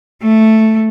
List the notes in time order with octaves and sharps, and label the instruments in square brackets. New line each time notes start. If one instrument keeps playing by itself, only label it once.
[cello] A3